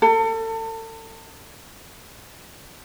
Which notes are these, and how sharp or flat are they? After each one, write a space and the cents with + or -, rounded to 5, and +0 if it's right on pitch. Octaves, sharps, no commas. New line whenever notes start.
A4 +35